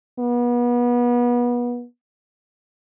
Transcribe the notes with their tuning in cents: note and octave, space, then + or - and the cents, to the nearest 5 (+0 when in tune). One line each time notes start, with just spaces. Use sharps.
B3 -30